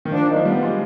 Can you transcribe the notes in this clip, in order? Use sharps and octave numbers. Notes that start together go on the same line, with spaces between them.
D#3
F3 D4
D#3
F3
G3 B3
G#3